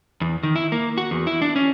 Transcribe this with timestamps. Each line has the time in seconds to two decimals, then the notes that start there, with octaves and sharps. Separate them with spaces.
0.21 E2
0.43 D#3
0.56 E4
0.72 A#3
0.98 F#4
1.11 E2
1.27 E4
1.42 D4
1.56 C#4